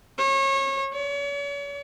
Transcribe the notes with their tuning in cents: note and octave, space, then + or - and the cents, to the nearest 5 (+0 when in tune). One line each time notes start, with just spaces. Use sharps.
C#5 -30
C#5 +40